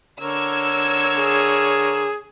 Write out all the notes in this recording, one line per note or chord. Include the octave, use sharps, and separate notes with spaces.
D3 A#4 C#5 E6 G#6
G#4